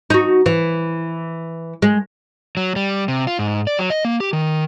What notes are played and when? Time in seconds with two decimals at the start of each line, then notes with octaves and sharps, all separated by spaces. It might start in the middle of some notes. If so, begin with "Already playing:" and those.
0.10 D#4 F#4
0.46 E3
1.82 G#3
2.57 F#3
2.76 G3
3.08 C3
3.27 F4
3.39 G#2
3.67 D5
3.79 F#3
3.90 D#5
4.05 A#3
4.20 G4
4.33 D#3